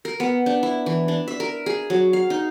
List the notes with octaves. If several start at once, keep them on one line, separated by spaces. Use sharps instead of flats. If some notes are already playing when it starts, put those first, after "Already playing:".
A#4
B3
D4
E4
E3
D4
E5
A#4
G#4
F#3
F5
D#4